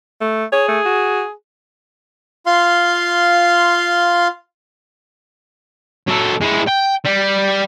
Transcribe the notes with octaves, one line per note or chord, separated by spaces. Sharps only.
A3
G#4 C#5
A3
F#4
F4 F5 C6
F#3 A4
G#3 E4
G5
G3